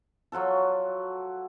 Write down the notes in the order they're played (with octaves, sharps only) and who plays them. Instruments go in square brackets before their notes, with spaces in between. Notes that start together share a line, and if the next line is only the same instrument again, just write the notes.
[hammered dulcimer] F#3 F4 F#4 A4